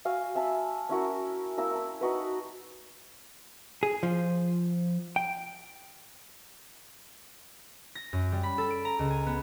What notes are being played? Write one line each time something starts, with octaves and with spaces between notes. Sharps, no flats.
F#4 F5 G#5
E5 G#5 A5 B5
C#4 E4 F#4 A#4
A#3 E4 A#5 E6
A5
D#4 F#4 B4
G#4
F3
G5
A#6
F#2
G3
B5
A4
D7
A#5
C#2
G#5
B3